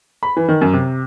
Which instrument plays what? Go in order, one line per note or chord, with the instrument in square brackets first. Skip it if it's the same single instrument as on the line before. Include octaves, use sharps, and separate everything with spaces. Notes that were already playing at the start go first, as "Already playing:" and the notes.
[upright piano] B5
E3
D#3
F#2
C3